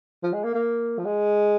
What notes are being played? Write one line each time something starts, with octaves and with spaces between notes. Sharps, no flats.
F3
G#3
A#3
A#3
F3
G#3